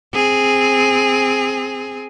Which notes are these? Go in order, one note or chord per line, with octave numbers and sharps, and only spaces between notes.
C4 G#4